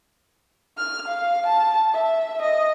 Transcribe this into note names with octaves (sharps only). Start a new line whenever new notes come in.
F6
F5
A5
E5
D#5